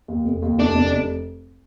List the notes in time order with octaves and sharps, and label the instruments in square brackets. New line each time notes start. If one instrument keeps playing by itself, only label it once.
[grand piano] D#2
F1
D#2
[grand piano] F1 [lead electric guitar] D4
[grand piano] F1
F1